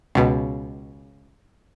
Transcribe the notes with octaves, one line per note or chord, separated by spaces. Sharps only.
C#2 B2